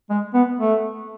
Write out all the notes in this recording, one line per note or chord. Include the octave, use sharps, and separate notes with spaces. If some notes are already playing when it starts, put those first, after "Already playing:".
G#3
B3
A3